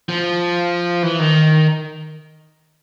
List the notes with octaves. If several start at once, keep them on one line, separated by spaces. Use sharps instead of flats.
F3
E3
D#3